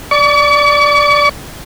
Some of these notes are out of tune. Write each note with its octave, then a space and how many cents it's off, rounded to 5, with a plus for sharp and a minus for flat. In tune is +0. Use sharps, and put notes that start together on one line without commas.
D5 +0 C#6 +45